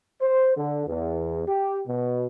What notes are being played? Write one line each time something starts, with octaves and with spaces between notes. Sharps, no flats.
C5
D3
E2
G4
B2